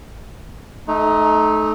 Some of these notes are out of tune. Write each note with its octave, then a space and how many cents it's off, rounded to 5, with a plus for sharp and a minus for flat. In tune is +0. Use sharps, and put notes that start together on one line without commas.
A3 -25 D#4 +0